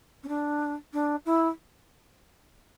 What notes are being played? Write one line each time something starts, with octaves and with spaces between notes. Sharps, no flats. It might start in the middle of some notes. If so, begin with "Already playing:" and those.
C#4
D4
D4
E4